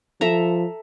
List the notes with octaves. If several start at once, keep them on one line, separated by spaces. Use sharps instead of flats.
F3 A4 E5 A#5